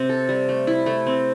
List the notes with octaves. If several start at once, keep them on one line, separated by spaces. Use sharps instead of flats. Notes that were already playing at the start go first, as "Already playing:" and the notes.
Already playing: C3 C4
A4
G3
A3
E4
A3
C4